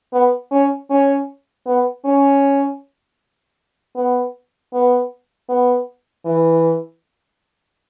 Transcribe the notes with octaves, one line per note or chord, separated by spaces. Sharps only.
B3
C#4
C#4
B3
C#4
B3
B3
B3
E3